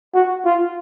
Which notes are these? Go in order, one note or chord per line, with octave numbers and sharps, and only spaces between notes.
F#4
F4